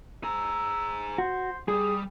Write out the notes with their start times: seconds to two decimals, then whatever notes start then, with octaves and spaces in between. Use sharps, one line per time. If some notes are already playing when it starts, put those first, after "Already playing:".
0.24 G#4 A#5 E6
1.18 F#4 C5
1.68 G3 G#4 D#6